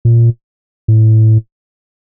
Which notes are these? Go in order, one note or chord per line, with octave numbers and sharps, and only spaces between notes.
A#2
A2